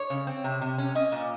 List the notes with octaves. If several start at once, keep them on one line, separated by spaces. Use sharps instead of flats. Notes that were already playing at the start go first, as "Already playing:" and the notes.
Already playing: C#5
C#3
C4
C3
C3
C#4
C#4 D#5
A#2